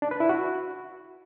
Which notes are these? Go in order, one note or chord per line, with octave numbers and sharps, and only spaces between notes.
D4
B4
E4
F#4